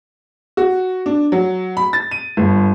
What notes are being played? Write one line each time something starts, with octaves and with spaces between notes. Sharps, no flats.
F#4
D4
F#3
B5
A6
D#7
G1